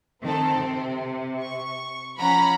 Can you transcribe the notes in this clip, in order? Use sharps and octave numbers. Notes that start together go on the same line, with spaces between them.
D#3 C4 A4
C3
C#6
F3 C#4 F#5 A#5 B5